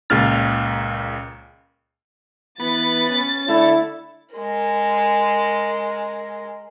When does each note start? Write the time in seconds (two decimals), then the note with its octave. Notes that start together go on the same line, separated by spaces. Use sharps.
0.10 C#2 A#2 C#3 F6 A6
2.60 E3 B3 A6
3.09 C#4
3.49 D3 A3 E4
4.35 G#3 A#4